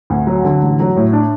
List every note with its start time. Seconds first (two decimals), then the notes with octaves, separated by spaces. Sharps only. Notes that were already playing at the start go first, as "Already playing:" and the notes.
0.10 D2
0.27 F#3
0.44 D3
0.62 A1
0.80 F#3
0.96 A2
1.13 D4